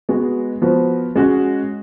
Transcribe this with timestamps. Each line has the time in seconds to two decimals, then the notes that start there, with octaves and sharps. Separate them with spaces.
0.09 G#3 B3 F#4
0.62 F3 B3 F#4
1.15 G#3 C#4 F#4